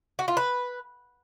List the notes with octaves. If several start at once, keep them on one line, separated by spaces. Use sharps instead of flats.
F#4
F4
B4